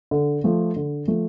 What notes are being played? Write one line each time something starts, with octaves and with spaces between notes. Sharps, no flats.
D3
F3 A3
D3
F3 A3